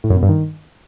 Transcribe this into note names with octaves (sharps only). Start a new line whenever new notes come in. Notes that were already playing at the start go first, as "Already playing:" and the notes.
A2
F#2
B2
G2
D#3